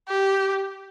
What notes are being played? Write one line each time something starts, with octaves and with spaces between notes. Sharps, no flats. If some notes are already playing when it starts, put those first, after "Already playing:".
G4